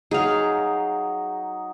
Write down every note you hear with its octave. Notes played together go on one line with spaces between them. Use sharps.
F#3 D#4 G#4 F5